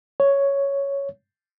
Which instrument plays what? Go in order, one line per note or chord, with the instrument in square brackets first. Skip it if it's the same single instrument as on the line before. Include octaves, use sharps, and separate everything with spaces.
[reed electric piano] C#5